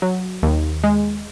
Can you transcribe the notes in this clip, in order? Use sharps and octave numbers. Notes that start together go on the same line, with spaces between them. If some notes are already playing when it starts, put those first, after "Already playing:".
F#3
D#2
G#3